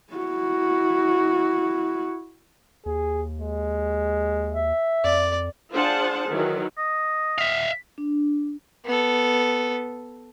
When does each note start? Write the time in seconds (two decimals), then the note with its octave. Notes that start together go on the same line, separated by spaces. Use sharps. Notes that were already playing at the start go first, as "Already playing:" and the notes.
0.13 E4 F#4
2.86 D#2 G#4
3.40 G#3
4.50 E5
5.04 F2 D5
5.73 D4 F4 G#4 C5 F#5 A5
6.29 D#3 E3 F#3
6.77 D#5
7.39 E5 F5
7.98 D4
8.86 B3 A4